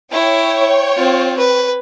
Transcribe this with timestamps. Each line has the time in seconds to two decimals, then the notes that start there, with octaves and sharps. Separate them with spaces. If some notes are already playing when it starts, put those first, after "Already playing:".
0.12 E4 C#5 G5
0.97 C4 F4
1.38 B4